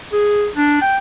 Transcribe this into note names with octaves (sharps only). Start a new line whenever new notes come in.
G#4
D4
G5